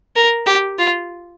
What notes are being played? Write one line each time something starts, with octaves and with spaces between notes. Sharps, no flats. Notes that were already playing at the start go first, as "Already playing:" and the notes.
A#4
G4
F4